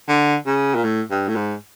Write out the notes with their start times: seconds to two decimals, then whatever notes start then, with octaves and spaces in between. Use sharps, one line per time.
0.08 D3
0.46 C#3
0.75 A#2
0.84 A2
1.10 G2
1.28 A2
1.36 G#2